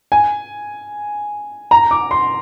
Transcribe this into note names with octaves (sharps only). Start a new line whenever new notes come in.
G#5
A#5
D6
C6